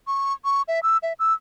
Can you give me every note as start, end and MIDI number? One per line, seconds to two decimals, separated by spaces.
0.07 0.33 85
0.45 0.62 85
0.68 0.80 76
0.83 0.97 88
1.03 1.13 76
1.19 1.33 88